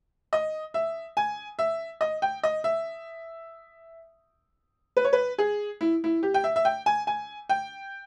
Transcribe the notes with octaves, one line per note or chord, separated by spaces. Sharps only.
D#5
E5
G#5
E5
D#5
G5
D#5
E5
B4
C#5
B4
G#4
E4
E4
G4
G5
E5
E5
G5
G#5
G#5
G5